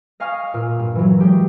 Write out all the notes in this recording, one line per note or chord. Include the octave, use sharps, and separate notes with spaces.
D#5 F5 G#5 C#6 D#6 F6
A#2
G2
E3 F#3
G#3 G4